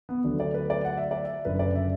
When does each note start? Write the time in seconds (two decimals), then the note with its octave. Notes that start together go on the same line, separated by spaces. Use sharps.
0.09 B3
0.24 D2 D3 F#3 A3 D4
0.40 D5
0.54 B4
0.70 D5
0.85 F#5
0.98 E5
1.11 D5
1.25 E5
1.45 F#1 F#2 D3 B4
1.59 D5
1.75 E5